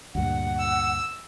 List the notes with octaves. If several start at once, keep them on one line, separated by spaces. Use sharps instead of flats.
D2 G2 A#2 F#5
E6